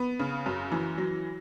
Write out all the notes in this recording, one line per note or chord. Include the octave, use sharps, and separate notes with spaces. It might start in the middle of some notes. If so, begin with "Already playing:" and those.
Already playing: B3
C#3
F#2
E3
F#3